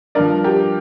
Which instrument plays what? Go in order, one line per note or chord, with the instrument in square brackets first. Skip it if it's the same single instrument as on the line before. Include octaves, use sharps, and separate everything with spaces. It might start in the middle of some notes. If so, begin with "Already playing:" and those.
[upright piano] G2 A#4 D5
F3
G4 A#4